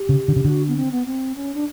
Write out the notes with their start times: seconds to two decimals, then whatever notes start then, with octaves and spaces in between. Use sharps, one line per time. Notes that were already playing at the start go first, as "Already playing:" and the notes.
Already playing: G4
0.09 C#3
0.28 D3
0.36 C#3
0.44 D3 F#4
0.68 B3
0.76 C4
0.92 B3
1.06 C4
1.36 C#4
1.54 D4